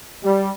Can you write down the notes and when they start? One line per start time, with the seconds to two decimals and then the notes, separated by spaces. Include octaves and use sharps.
0.23 G3